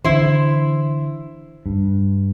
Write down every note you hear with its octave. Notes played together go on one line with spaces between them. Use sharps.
D3 E3 E4 C5
G2